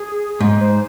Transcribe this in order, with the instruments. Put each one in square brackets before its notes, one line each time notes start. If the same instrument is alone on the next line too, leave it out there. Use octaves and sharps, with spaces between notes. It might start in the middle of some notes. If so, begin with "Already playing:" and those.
Already playing: [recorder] G#4
[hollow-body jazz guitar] G#2
[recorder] C5